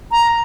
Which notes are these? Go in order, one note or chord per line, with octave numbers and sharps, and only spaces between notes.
A#5